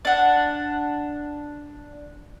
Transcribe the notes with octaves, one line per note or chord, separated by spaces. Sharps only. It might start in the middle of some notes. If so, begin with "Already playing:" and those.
D4 F#5